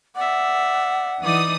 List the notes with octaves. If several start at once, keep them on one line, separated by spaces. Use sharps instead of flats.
D5 E5 F#5
E3 D#4 D5 D#6